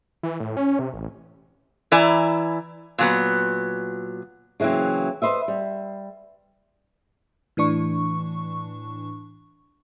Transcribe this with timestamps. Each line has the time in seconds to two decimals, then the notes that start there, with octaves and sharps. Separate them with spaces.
0.23 E3
0.40 A2
0.57 C#4
0.79 C3
0.94 A1
1.92 E3 E4 D5 G#5 A#5
2.98 A#2 F#3 B3
4.60 C#3 E3 F#3 A#3 C4
5.22 B4 C5 D#5 E5
5.48 G3
7.57 A2 E3 D4 C#6